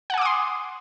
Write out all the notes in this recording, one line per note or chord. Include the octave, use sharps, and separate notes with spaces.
F#5 G#5 C6 D6 D#6